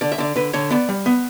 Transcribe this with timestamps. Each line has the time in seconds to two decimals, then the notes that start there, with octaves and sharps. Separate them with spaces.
0.01 D3 D5
0.12 E5
0.18 D3 D5
0.36 D3 B4
0.53 D3 C#5
0.70 B3 D5
0.89 G3
1.06 B3